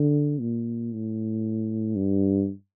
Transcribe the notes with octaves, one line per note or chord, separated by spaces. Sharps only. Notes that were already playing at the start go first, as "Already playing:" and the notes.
Already playing: D3
A#2
A2
G2